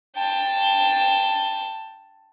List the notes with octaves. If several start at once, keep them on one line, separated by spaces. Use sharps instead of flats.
G5 A5